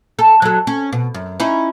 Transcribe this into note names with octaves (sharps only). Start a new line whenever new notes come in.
A4
F#3 A4
C#4
B2
F#2
C#4 D#4 E4